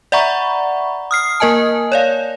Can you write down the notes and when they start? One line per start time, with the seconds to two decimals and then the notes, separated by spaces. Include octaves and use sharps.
0.12 D5 E5 F#5 A#5 B5 C#6
1.11 D#6 F6 C7
1.40 A#3 A#4 D#5 G#5 A5
1.92 C#5 D5 F5